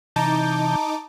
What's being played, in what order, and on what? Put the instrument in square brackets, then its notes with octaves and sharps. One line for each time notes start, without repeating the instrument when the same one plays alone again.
[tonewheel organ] C3 E3 G6 [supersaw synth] D#4 D6 [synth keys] A5 A#5